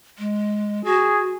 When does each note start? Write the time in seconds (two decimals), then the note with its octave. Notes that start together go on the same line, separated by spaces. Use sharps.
0.19 G#3
0.85 F#4 G#4